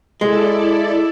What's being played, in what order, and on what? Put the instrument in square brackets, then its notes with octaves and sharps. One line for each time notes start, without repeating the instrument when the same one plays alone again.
[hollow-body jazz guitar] G#3 [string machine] E4 A4 D5